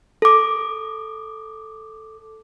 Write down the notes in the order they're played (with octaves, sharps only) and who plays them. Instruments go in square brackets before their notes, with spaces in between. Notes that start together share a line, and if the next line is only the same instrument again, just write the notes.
[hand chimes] A4 D6